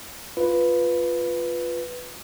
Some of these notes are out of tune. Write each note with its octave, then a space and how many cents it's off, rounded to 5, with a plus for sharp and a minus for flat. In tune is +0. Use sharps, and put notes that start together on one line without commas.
F4 +0 B4 +0